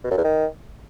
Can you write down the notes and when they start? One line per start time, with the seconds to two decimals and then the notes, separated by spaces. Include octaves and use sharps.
0.04 B2
0.11 F#2
0.17 E2
0.24 D#3